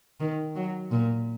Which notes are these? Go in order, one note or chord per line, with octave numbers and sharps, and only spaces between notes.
D#3
F#3
A#2